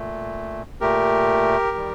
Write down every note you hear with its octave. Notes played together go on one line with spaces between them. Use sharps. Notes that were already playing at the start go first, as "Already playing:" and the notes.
Already playing: A#2 A3
A#2 A3 G4 A#4
D#3 G3